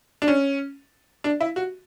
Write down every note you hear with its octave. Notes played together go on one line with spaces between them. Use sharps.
D4
C#4
D4
E4
F#4